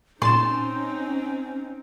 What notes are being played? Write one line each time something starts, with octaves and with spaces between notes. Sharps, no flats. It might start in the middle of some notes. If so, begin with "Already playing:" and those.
A#2 C4 C#4 D#4 C6 A6 E7